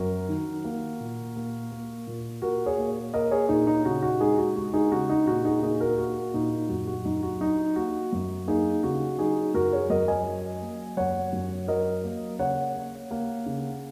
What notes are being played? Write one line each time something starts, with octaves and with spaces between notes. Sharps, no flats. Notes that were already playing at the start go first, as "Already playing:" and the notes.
Already playing: F#2 F#4 A#4
D#3
A#3
A#2
A#3
A#3
A#2
A#2 F#4 A#4
G#4 C#5
A#3
A#3 A#4 D#5
G#4 C#5
A#2 D#4 G#4
D#4
C#3 F#4
F#4
G#3 D#4 G#4
F#4
G#3 F#4
D#4 G#4
C#3 F#4
D#4
A#2 F#4
D#4 G#4
A#3 D#4 G#4
F#4 A#4
A#3 F#4
A#2 D#4
F#2 F#4
F#4
F#2 D#4
F#4
F#3 D#4
A#3 F#4
F#2 F#4
A#3 D#4 G#4
C#3 F#4
F#3 D#4 G#4
F#2 F#4 A#4
G#4 C#5
F#2 A#4 D#5
D#5 G#5
F#3
A#3
F#2 C#5 F#5
F#2
F#3 A#4 D#5
A#3
C#3 C#5 F#5
A#3
A#3
C#3